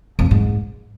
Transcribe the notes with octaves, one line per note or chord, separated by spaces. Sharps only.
F2
D3
G#2